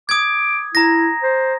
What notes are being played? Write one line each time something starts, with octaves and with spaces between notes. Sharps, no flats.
D6 D#6 G#6
E4 A#5 A#6
C5